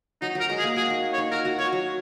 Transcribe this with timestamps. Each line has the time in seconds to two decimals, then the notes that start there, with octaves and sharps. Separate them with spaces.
0.22 F#3 D#4
0.35 F#3 A#4
0.49 G#3
0.59 G#4
0.64 A#3
0.76 F#4 G#4
0.90 D#4
1.13 C#5
1.18 D#4
1.31 F#4 A#4
1.45 F#4
1.59 F#4 C#5
1.72 F#3